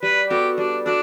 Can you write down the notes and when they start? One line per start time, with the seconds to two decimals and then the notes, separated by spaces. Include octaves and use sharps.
0.03 G3 B4
0.29 B3 F#4 G4 A4
0.58 G3 D4
0.86 D4 F#4 A4